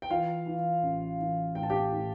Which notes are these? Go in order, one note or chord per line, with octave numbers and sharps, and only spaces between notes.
G5
E3 F4 F5
E3
A1
E3
A2 G5
A5
G4 G5
A2